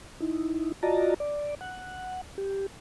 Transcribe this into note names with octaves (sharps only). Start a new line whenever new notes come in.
D#4 E4
F4 F#4 D5 D#5 A5 A#5
D5
F#5
G4